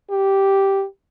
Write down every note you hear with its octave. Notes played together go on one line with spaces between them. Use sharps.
G4